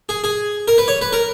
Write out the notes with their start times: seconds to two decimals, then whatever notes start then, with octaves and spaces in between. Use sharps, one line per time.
0.09 G#4
0.24 G#4
0.68 A#4
0.78 B4
0.88 C#5
1.02 B4
1.13 A#4